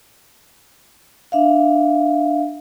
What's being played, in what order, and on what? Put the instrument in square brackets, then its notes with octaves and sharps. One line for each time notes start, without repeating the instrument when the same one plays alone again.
[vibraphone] D4 E5 F5